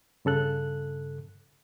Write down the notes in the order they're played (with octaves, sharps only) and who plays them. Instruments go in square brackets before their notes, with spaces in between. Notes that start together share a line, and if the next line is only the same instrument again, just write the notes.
[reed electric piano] G2 C#3 A4 F#6